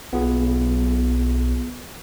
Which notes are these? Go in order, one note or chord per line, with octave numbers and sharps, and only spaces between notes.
B1 B3 F4 G#4